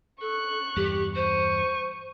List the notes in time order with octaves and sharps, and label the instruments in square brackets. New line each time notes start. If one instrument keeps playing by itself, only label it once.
[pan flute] A4 [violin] C#6 F#6
[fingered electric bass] E2 G2 [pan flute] G4
[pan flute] C5 [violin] C#6 D#7